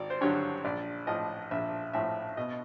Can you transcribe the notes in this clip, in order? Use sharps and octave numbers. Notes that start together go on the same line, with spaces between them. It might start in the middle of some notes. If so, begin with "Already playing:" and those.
Already playing: G#1 D5
C5
G2 D3 F#3 C#5
A#1 D5
A2 F3 D#5
A#1 E5
A2 F3 E5
B2 D#5